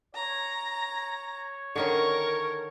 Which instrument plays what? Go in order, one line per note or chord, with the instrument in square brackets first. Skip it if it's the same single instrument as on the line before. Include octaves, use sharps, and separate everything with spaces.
[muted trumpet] C#5 [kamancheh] A#5
[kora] D3 D#3 C#4 [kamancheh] A#4 [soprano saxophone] C#6